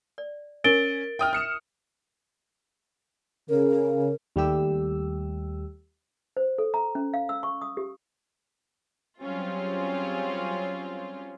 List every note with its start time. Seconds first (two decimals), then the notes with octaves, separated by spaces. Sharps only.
0.18 D5
0.64 C#4 A#4 A6 D7 G7
1.19 E5 G5 D#6 F6
1.33 F6 C#7 E7
3.49 C#3 A#4
4.36 D#2 G3 A3 G4 E6
6.37 C5
6.58 A4
6.74 A#5
6.95 C#4
7.14 F5
7.29 E6
7.43 C#6
7.62 D#6
7.77 G4
9.23 F#3 G3 C4 C#4 F4 G#4